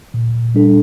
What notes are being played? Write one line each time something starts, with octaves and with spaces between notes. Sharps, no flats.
A#2
G3 D4 A4